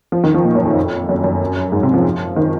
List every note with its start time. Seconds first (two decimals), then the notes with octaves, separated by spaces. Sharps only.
0.12 F3
0.24 D#3
0.34 F3
0.44 A#2
0.55 F#2
0.65 F2
1.09 F#2
1.24 F#2
1.72 G#2
1.83 C3
1.94 F3
2.36 D#3